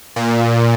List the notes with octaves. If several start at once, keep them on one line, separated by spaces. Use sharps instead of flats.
A#2